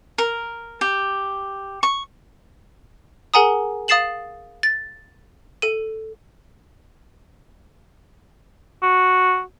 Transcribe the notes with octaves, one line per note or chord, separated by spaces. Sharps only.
A#4
G4
C#6
G#4 A#4 F#5 G#5 A#5 D#6
F5 D#6 A6 C7 E7 F#7
A6
A4 D#7
F#4